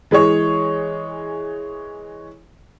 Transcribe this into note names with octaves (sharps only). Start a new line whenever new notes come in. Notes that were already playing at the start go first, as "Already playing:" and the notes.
E3 G#3 G#4 C#5